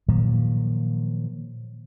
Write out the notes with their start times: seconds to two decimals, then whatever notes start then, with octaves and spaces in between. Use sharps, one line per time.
0.08 A#2 D#3 F3 F#3